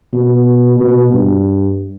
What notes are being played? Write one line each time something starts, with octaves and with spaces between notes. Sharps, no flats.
B2
B2
G2